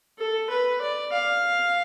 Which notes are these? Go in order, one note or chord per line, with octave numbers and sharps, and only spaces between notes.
A4
B4
D5
F5